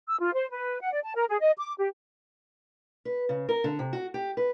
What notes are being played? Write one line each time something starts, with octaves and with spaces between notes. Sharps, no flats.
E6
F4
C5
B4
F#5
D5
A5
A#4
G#4
D#5
D6
G4
B4
C#3
A#4
D3
C3
F#4
G4
B4